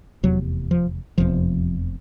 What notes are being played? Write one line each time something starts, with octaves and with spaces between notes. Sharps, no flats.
F1 E2 C3 F#3
F3
F1 E2 C3 F3